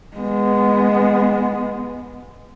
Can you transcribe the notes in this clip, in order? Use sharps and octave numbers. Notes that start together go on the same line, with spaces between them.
G#3 B3